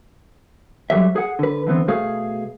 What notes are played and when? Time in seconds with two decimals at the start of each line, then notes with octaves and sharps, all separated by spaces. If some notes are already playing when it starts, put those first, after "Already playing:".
0.90 F2 F#3 G3 E5
1.16 G#4 F#5
1.39 D3 B4
1.67 D3 E3 B3 C4
1.88 B2 A3 G#4 F5